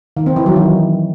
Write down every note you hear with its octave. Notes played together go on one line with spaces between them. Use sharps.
D#3
C4
E3
F#3
D#3